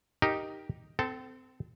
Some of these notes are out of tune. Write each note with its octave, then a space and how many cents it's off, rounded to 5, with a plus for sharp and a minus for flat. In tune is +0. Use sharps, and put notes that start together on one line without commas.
D#4 +0 G4 +0 A#4 +5
C4 -30 A4 +0